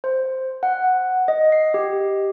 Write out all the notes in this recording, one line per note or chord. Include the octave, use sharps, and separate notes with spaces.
C5
F#5
D#5
C7
G4